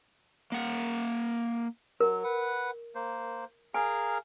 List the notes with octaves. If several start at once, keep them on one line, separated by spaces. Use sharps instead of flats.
A#3 F#5
F#3 A#4
B4 F#5
A#3 C5
G#4 A#4 F5 G#5